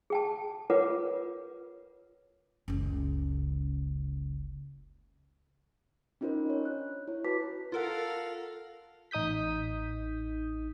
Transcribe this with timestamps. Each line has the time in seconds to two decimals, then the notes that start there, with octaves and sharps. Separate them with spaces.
0.10 G#4 G5 A5
0.70 F4 A#4 B4 C#5 F#5 D6
2.68 F#1 C#2
6.21 C#4 D#4 F4 A#4 C5 D#5
6.46 D4 C#5
6.65 F#6
7.08 E4 C#5
7.24 F#4 B4 A5 D6 B6
7.72 F4 A4 A#4 F5 F#5
9.11 A1 D#4 D#6 G6 B6